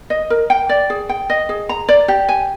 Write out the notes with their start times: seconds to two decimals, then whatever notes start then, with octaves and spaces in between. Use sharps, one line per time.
0.10 D#5
0.30 A#4
0.50 G5
0.69 D5
0.90 G#4
1.09 G5
1.30 D#5
1.49 G#4
1.69 A#5
1.89 D5
2.08 G4
2.29 G#5